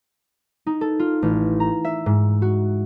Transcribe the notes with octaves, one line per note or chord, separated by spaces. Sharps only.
D#4
A4
F4
A1
A#5
E5
G#2
F#4